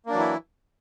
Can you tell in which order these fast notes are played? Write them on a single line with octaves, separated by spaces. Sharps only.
A#3 D4 F#3 E3 E4